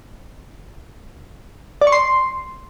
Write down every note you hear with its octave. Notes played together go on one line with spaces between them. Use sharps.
D5
C#6
C6